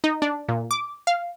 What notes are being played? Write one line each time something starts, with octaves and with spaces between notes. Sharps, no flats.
D#4
D4
A#2
D6
F5